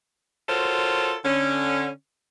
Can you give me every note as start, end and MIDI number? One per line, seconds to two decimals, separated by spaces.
0.48 1.15 65
0.48 1.15 66
0.48 1.15 69
0.48 1.15 70
0.48 1.15 72
0.48 1.15 73
1.24 1.88 50
1.24 1.88 61